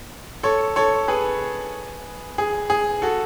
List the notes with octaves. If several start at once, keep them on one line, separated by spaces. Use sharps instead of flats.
A4 C#5
A4 C#5
G#4 B4
G#4
G#4
F#4 A4